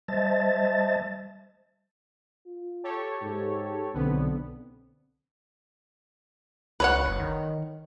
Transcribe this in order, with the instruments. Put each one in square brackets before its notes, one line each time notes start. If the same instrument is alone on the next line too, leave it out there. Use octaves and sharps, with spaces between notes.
[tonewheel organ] G3 C5 D#5 E5 A5 A6
[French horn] F4
[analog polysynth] G4 A4 C#5
[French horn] G#2
[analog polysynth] B1 D3 B3 [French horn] C4
[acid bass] C#2 [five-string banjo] B4 C#5 F#5
[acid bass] F#1
D#3